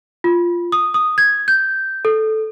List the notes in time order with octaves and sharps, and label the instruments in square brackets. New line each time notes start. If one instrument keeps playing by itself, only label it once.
[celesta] F4
D#6
D#6
G#6
G6
A4